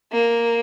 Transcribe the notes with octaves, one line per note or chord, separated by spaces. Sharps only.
A#3